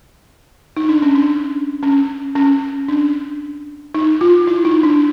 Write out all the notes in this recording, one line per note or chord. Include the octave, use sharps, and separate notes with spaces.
D#4
D4
C#4
D4
C#4
C#4
D4
D#4
F4
E4
D#4
D4